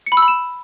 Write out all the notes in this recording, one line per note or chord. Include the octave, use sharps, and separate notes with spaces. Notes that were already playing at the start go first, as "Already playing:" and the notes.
C#7
B5
E6
B5
E7